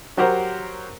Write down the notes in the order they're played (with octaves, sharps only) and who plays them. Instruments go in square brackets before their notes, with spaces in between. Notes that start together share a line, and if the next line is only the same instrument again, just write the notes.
[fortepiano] F#3 F#4 G4 A#4 C5